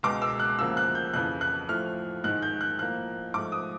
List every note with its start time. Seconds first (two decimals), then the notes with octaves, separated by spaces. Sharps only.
0.03 C#2 B2 G#3 D6
0.22 E6
0.40 F#6
0.59 D2 C#3 F3 A#3 E6
0.77 F#6
0.95 G6
1.14 F2 C#3 E3 F#6
1.41 F#6
1.68 A2 F3 A3 F6
2.24 G#2 D#3 G#3 F#6
2.42 G6
2.61 F#6
2.79 A2 F3 A#3 F#6
3.34 G#2 F3 A3 D6
3.52 D#6